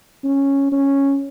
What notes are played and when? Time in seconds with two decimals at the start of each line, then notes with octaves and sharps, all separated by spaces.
0.24 C#4
0.72 C#4